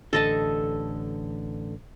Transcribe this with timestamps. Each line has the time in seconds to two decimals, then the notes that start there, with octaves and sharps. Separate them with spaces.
0.13 A1 D3 A4 D#5 A5